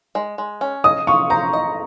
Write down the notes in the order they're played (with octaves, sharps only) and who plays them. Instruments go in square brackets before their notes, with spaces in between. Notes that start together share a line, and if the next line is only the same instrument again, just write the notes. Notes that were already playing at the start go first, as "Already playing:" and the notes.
[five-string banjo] G#3
G#3
C#4
[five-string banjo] D#5 [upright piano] D#6
[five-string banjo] F4 [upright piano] C#6
[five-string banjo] C5 [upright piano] A#5
[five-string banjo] D#5